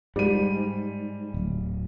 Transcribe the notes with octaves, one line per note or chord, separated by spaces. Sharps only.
G#2 G3 D#7
D1